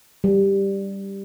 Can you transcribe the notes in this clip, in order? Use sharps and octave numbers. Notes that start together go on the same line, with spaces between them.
G3